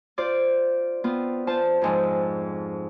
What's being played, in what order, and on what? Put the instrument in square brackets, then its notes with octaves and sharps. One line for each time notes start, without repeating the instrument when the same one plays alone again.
[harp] F4 C5 D5
B3 C4 F4
F4 C5 A5
F2 G#2 F3